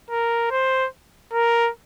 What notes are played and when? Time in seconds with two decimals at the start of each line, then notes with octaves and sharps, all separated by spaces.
0.10 A#4
0.51 C5
1.33 A#4